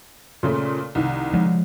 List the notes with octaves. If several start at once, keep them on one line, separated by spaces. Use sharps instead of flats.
A#2 C#3 A3
C2 D#3
F3 G#3